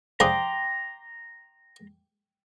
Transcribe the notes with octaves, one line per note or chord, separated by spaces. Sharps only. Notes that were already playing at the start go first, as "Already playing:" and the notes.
F3 D4 G#4 G5 A#5 C6 D6